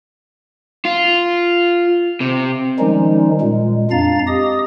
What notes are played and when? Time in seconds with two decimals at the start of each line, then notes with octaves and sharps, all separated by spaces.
0.85 F4
2.20 C3
2.79 D#3 F3 G3 G#3 C#4 D#4
3.41 A#2 G#3
3.91 F2 D4 F5 A#5 A6
4.27 G4 D#5 D#6